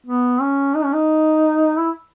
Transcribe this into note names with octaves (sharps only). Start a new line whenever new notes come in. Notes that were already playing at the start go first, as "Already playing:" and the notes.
B3
C#4
D#4
C#4
D#4
E4